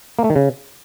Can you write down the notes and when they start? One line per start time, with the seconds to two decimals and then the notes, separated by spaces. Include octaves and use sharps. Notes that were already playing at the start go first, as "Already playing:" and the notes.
0.19 A#3
0.24 A3
0.30 D#3
0.36 C#3